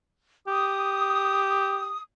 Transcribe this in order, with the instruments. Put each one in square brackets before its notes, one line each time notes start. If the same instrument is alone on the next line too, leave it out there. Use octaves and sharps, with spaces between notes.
[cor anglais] G4 [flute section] D#6